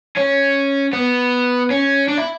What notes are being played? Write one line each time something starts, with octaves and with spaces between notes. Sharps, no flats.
C#4
B3
C#4
D4
E4